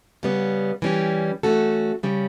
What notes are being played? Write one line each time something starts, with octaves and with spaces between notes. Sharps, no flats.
C#3 G3 B3
E3 G3 C#4 G4
E3 A3 C#4 F#4 A4
C#3 G3 C#4